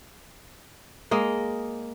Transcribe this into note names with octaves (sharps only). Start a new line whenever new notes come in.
G#3 A#3 D#5